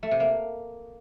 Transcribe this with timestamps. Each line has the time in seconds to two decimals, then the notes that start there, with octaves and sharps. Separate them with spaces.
0.03 A3
0.11 C3
0.20 A#3